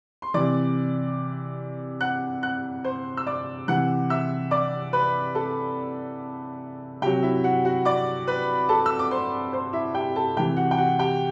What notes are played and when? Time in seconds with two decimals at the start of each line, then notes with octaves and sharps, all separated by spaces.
0.22 C6
0.34 C3 E3 D5 D6
2.01 F#5 F#6
2.43 F#5 F#6
2.84 C5 C6
3.17 E6
3.26 D5 D6
3.68 C3 E3 F#5 F#6
4.10 E5 E6
4.51 D5 D6
4.93 B4 B5
5.35 A4 A5
7.02 C3 G4 G5
7.06 F#3
7.22 E4 E5
7.44 F#4 F#5
7.65 F#4 F#5
7.85 D5 D6
8.27 B4 B5
8.69 A4 A5
8.86 E6
8.99 D6
9.11 C5 C6
9.53 C5 C6
9.73 E4 E5
9.94 G4 G5
10.16 A4 A5
10.37 C3 E3 G4 G5
10.57 F#4 F#5
10.71 G5
10.78 F#4 F#5
10.99 G4 G5